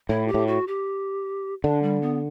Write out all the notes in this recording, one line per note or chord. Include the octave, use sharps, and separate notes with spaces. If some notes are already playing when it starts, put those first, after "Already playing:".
A2 E4
G4
A2
F#4
G4
D3 D4
G3
B3